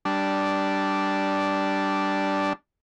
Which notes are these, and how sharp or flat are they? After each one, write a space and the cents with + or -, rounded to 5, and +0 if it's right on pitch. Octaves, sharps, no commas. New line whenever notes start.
G3 -10 D4 -5